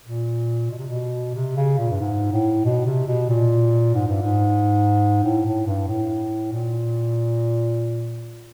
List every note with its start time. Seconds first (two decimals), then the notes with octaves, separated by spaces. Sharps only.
0.05 A#2
0.70 B2
0.78 C3
0.86 B2
1.34 C3
1.56 C#3
1.78 A#2
1.90 G2
2.00 G#2
2.32 A2
2.65 B2
2.86 C3
3.07 B2
3.29 A#2
3.94 G#2
4.07 G2
4.21 G#2
5.24 A2
5.45 A2
5.66 G2
5.88 A2
6.52 A#2